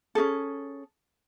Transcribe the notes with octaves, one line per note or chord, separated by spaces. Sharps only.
C#4 D#4 G#4 A4